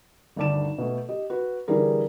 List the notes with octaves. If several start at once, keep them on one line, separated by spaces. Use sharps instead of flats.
G1 D2 D#3 D5 A5 E7
B2 A3
G4 D#5
F#4 B4
D3 E3 G3 G#4 A#4